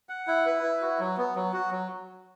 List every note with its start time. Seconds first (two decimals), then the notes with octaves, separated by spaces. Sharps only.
0.09 F#5
0.27 E4
0.46 B4
0.63 E4
0.81 F#4
0.99 F#3
1.18 B3
1.36 F#3
1.54 F#4
1.71 F#3